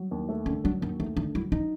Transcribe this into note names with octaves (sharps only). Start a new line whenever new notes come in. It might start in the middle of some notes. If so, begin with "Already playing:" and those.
Already playing: F#3
D#2
A3
D3 C#4
F#3 D4
D#2 D#4
A3 D#4
D3 D#4
F#3 E4
D#4